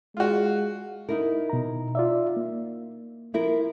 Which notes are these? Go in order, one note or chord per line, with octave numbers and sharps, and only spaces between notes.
G#3 F4 F#4
D#4 E4 A#4
B2 A#5
F4 D5 E5
A#3
F3 E4 A#4